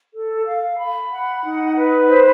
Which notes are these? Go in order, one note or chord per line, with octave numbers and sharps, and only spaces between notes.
A4
F5
B5
F#5
D#4
B4
C5